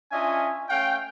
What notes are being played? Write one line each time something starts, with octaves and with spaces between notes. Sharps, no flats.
C#4 D4 F4 D#5 E5 G#5
A3 C#4 F5 G5